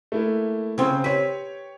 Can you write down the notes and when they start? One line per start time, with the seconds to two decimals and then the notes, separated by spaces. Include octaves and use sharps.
0.12 A3 A#3 E4
0.78 C#3 C4 C#5
1.04 G4 B4 C#5